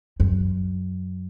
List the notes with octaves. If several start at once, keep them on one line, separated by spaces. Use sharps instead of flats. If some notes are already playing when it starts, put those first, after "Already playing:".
F#2